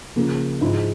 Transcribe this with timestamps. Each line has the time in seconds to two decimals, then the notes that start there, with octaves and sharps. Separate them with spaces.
0.16 C#3 F3 A#3
0.61 G#2 F3 G#3 E4